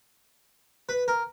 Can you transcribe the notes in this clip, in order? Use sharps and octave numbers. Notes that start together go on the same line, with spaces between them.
B4
A#4